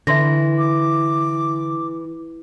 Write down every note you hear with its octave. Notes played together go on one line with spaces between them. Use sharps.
D3 E3 E5 C6 A#6
D6